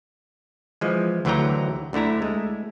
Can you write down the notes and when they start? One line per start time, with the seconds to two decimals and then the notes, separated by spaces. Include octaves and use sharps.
0.81 E3 F3 G#3
1.25 D2 D3 E3 F#3 G5 A#5
1.93 D2 D3 A3 E4 A#5
2.22 G#3 A3